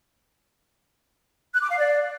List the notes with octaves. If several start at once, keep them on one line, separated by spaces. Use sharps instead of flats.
F#6
D6
F5
D5